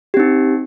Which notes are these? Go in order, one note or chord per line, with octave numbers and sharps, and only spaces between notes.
C4 D#4 G4